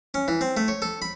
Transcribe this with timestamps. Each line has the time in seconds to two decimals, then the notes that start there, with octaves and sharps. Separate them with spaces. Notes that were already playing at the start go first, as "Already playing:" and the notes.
0.14 C#4
0.28 E3
0.41 C4
0.57 A3
0.68 C#5
0.82 A4
1.02 B5